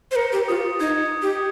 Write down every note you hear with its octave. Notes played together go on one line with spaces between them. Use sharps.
C5
A#4 C#7
G4
F4 D#6
D#4 G#6
D#6
G4